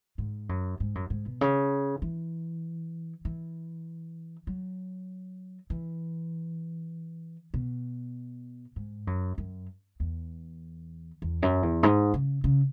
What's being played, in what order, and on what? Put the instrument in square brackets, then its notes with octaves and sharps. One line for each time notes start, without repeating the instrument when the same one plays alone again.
[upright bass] G#2
F#2
G#2
F#2
G#2
B2
C#3
E3
E3
F#3
E3
B2
G#2
F#2
F#2
E2
E2
F#2
E2
G#2
C#3
C#3